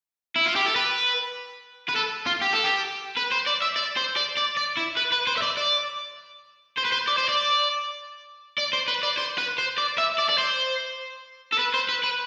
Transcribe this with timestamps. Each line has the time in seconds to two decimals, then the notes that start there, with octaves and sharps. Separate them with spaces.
0.36 E4
0.46 F4
0.56 G4
0.66 A4
0.76 B4
1.89 B4
1.96 A4
2.26 F4
2.41 G4
2.53 A4
2.64 G4
3.17 B4
3.32 C5
3.46 D5
3.62 E5
3.76 D5
3.97 C5
4.17 D5
4.37 D5
4.57 D5
4.77 E4
4.97 B4
5.12 B4
5.27 C5
5.37 E5
5.42 D5
5.57 D5
6.77 C5
6.85 B4
6.92 C5
7.08 D5
7.18 C5
7.29 D5
8.58 D5
8.73 C5
8.88 B4
9.03 D5
9.18 C5
9.38 B4
9.58 C5
9.78 D5
9.98 E5
10.19 D5
10.30 D5
10.38 C5
11.52 A4
11.59 B4
11.74 C5
11.89 B4
12.03 B4